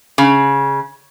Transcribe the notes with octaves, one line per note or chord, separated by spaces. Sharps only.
C#3